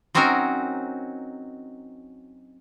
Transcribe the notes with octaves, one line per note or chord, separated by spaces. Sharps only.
F#3 C4 C#4 D#4 F#4 A#4